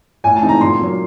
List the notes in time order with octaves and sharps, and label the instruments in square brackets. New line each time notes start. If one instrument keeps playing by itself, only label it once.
[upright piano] A2 G#5
A5
E3 G#3 C4 D#4
A#5
A#2 C6
F#3 A#3